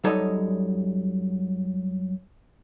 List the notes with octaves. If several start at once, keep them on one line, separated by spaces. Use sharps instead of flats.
F#2 G3 D#4 A4 C#5 D#5